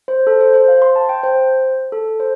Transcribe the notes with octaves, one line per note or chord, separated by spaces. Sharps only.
C5
A4
C5
C5
F5
C6
A5
G5
C5
A4
C5